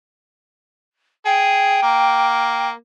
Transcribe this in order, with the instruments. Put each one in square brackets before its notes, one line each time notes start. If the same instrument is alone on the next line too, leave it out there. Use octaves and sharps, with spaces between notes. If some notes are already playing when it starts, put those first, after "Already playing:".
[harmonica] G#4 [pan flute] G5
[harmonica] A#3